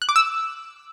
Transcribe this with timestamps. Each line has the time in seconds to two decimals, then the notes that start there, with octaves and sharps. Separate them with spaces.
0.02 F#6
0.09 D6
0.16 E6